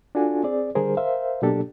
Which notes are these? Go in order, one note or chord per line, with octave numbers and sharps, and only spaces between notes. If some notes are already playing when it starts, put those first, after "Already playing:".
D4 F4 F#4 A4 G#5
C4 G#4 D5
D3 G3 G#4 A#4 C5
A#4 C5 E5 F5
B2 F#3 A#3 D4 G4 A4